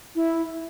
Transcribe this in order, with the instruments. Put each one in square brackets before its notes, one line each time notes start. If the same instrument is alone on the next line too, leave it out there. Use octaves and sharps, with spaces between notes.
[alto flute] E4